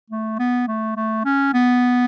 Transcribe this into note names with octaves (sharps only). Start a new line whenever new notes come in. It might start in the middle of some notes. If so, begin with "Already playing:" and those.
A3
B3
A3
A3
C#4
B3